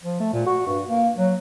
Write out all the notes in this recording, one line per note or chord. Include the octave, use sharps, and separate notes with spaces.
F3
A3
A#2
F#4
G2
A#3
F#3